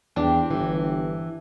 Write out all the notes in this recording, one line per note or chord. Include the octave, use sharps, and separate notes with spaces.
E2 C4 D4 G4
G1 E3